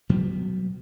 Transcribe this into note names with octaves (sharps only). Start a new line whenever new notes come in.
B2 F#3 G3 B3